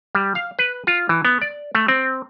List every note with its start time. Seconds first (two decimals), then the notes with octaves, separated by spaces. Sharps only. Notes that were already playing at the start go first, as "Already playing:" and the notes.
0.15 G3
0.35 F5
0.59 B4
0.87 F4
1.09 E3
1.25 B3
1.42 D5
1.75 A3
1.88 C4